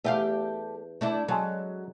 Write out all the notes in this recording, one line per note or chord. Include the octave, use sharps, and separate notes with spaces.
E2 A3 G4 F5
A3 D4 E4
F#3 G#3 C#4 A4